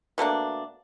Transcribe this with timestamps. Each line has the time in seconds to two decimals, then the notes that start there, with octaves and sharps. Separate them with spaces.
0.18 B2 A3 A#3 D4